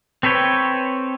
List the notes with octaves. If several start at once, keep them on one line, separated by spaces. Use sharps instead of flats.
C4 A4 B4 C#5 G5